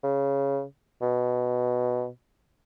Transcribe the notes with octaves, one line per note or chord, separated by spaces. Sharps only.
C#3
B2